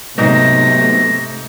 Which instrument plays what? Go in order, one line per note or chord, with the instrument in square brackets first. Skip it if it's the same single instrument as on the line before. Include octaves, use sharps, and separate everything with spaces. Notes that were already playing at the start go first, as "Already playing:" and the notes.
[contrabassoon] B1 [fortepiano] G#2 [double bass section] C3 A3 [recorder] A#6